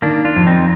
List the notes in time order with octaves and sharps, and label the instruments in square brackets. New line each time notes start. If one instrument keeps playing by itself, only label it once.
[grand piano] D#3 [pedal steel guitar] A#3 D4
[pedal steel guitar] D4 F4
[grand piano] F2
[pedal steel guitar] C4 D#4